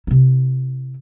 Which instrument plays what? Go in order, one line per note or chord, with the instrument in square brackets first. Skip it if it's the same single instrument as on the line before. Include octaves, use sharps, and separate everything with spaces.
[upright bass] C3 E4